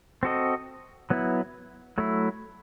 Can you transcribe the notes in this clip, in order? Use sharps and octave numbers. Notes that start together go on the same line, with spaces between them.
C4 F#4 A4 D#5
F#3 B3 E4
F#3 A3 E4